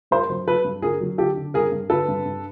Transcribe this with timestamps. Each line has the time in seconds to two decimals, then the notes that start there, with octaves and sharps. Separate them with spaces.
0.11 G2 A#4 C5
0.30 F#3
0.48 F#3 A4 B4
0.65 G2
0.82 D3 G#4 A#4
1.01 F#3
1.18 D3 G4 A4
1.36 D3
1.54 G2 G#4 A#4
1.72 G2
1.90 D3 A4 B4
2.08 G2
2.26 G2